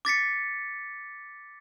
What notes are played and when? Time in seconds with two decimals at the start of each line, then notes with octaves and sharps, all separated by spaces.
0.05 D6 A6 B6 C#7